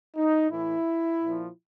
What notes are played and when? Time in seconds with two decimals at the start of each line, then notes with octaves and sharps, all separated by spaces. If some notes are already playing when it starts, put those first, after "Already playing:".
0.15 D#4
0.51 A2 E3 E4
1.24 A#2 F3